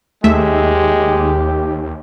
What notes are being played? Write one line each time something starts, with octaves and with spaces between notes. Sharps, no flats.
D#2 G#3 A3 G4 E5